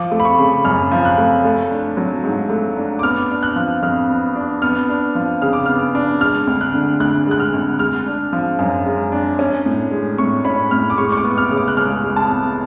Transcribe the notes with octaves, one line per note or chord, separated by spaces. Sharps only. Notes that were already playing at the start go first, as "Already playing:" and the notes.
Already playing: F3 D6
A3
B5
C#6
C#3
F#2 F6
F3
F#6
A3
A3
D4
F#3
G#2
A3
D4
D6
B3 F6
D4
F#6
F3
F2 F6
B3
D4
B3 F6
D4
F3
C#3 F6
D6
B3 F6
D4
G#3 F6
D2
F#6
D3
D2 F#6
G#3 F#6
F6
D2
G#3 F6
D4
F3
F#2
G#3
D4
C#4
A2
G#3
A2 C#6
C#4 B5
A2 F6
D6
G#3 C#6
C#6
D6
B3
F6
C#3
D6
F#6
C#2 F6
G#3
A5
B3